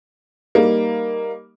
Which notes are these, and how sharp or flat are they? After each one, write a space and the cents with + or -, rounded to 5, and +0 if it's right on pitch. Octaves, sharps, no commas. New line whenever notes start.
G3 +0 A#3 +0 D#4 +0